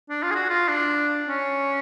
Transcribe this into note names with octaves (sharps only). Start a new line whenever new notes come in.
D4
F4
G#4
F#4
F4
D4
C#4